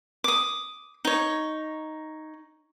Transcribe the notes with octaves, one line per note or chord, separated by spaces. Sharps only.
D6 D#6
D#4 C#5